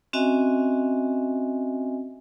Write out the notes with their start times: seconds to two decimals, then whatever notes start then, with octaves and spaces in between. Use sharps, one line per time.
0.13 C4 C#4 F#4 D#5 E5 G#5